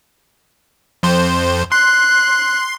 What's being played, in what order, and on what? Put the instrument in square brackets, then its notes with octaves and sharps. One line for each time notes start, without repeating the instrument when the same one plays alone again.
[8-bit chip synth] F2 C5
[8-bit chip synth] C6 [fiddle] F#6